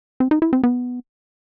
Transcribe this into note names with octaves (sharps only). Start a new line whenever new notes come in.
C4
D#4
E4
C4
B3